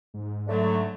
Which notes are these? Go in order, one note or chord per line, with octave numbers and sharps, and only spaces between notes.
G#2
D3 F#3 A3